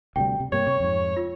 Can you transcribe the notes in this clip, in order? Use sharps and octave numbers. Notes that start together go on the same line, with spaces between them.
D2 C3 G3 G5
C3
G2 C3 A#3 C#5 G#6
C3 C#6
F2 G#2
F4